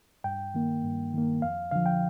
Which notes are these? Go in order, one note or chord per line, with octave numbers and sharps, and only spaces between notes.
G2 G5
D#3 A#3
G2
D#3 A#3
F2 F5
D3 F3 F5
G5